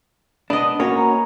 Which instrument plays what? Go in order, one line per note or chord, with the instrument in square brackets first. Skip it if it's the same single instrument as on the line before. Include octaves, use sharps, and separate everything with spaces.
[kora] B3 D#5 [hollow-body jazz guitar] D4
[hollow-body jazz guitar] A#3 C#4 F#4 [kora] C#5
[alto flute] A#5